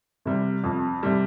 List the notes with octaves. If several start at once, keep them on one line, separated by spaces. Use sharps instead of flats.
C3 G3
F2
C3 G3